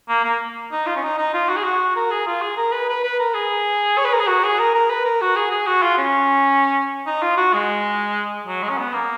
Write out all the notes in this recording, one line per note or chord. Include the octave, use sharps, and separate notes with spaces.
A#3
A#3
D#4
F4
C#4
D#4
D#4
F4
F#4
G#4
F#4
A#4
G#4
F4
G#4
A#4
B4
B4
B4
A#4
G#4
C#5
B4
A#4
G#4
F#4
G#4
A#4
A#4
B4
A#4
F#4
G#4
G#4
F#4
F4
C#4
D#4
F4
F#4
G#3
F#3
G#3
C#4
B3
A#3